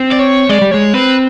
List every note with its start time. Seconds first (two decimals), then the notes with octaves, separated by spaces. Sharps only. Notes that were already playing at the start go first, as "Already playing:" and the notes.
Already playing: C4
0.12 D5
0.19 C#5
0.49 G#3 D5
0.62 G3
0.72 G#3 C#5
0.94 C4 B4